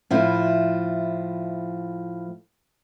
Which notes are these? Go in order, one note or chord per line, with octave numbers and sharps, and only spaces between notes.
A2 F3 E4